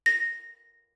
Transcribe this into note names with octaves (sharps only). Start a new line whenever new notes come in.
A#6